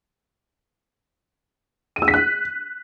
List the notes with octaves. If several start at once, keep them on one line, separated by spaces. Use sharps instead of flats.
D#7
E6
B6
F#6